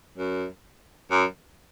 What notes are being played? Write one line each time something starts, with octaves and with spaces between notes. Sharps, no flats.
F#2
F#2